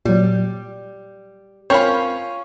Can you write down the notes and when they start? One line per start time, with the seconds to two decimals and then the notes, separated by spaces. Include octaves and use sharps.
0.05 A#2 F#3 G3
1.70 C4 C#4 F4 A#4 C#5 B5 C#6